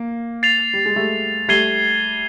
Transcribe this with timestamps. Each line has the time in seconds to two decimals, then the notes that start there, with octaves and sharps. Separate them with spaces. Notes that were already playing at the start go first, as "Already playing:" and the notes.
Already playing: A#3
0.43 A6 C7 F7
0.73 G3
0.86 G#3
0.96 G3 A3
1.48 G3 A3 G#6 C7 D#7 G7